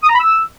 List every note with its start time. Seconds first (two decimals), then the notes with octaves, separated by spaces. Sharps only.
0.03 D#6
0.08 A#5
0.14 B5
0.20 E6